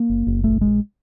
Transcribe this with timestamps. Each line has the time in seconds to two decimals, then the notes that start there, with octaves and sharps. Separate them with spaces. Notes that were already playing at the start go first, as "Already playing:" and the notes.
Already playing: A#3
0.10 F#1
0.27 F#1
0.44 A#1 A3
0.61 A#1 G#3